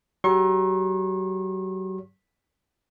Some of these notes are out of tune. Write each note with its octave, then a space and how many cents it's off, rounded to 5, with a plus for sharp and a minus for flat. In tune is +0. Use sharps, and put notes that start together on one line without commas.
F#3 +30 G4 +30 C#6 -45